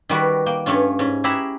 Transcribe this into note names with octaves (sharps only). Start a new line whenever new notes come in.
D#3 G3 F#4 A#4 B4
A#3 G5
G2 A3 C#4 F4
G#2 C#4
E4 G4 G#4 E5 F#5 A#5